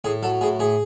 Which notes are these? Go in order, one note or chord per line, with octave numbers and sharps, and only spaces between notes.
A2 G#4
F#3 A4
A2 G#4
A2 G#4